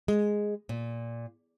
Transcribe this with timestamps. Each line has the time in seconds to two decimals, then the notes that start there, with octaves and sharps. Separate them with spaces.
0.08 G#3
0.69 A#2